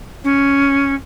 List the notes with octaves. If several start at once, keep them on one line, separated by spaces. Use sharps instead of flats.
C#4